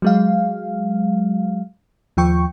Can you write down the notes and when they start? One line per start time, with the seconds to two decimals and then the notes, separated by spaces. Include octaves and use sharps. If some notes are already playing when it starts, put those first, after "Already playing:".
0.02 F#3 G#3 F5
2.17 D#2 F3 G5 C#6